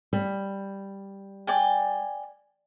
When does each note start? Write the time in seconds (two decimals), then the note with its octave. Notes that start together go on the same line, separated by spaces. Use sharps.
0.13 G3
1.47 D5 G5 G#5